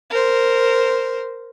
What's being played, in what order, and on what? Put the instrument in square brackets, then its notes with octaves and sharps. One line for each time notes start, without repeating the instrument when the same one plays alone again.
[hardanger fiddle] A#4 C5